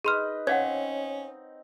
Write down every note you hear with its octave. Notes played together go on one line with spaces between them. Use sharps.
D#4 G#4 B4 C6 F6
C4 C#4 C#5 F5 F#5 G#6